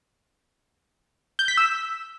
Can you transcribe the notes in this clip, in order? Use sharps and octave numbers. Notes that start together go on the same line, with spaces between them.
G6
B6
E6